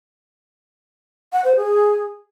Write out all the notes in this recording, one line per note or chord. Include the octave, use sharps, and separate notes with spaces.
F#5
C5
G#4